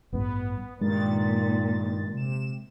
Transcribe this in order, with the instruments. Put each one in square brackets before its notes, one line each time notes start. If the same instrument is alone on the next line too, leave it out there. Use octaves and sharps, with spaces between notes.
[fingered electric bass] A1 G2 G3 [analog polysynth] B3
[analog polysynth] G2 D#3 A6 [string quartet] A#2 [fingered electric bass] G#3
[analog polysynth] C3 E7